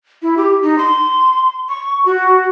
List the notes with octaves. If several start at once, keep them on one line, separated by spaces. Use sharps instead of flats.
E4
G4
D#4
C6
C#6
F#4